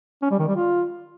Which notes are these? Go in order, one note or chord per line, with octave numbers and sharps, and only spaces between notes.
C#4
G3
D#3
G3
F4